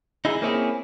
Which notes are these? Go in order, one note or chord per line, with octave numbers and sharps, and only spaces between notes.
D#4 E4 G#4
A#3 C4 C#4 E4 G#4